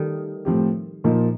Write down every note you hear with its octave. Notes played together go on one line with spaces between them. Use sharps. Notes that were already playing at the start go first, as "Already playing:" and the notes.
Already playing: D#3 G3 A3
A2 F3 C4 G4
A#2 F3 A#3 D#4